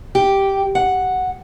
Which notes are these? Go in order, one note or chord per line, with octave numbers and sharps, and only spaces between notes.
G4
F#5